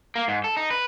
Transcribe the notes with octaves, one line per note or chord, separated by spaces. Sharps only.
A#3
G#2
A4
D#4
B4